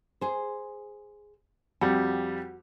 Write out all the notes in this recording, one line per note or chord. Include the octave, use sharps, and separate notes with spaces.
G#4 C5
F2 G3 F#4